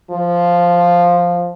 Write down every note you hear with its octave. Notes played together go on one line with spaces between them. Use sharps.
F3